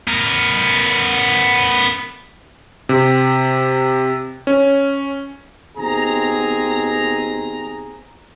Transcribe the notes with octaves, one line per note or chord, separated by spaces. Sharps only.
B3 A#4
C3
C#4
D#2 B2 C4 G#4 A#5